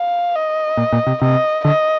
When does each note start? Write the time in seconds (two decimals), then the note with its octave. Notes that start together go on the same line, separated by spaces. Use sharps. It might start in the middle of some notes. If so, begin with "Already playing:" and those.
Already playing: F5
0.35 D#5
0.77 A#2
0.92 A#2
1.07 C3
1.22 C3 D#5
1.65 D3 D#5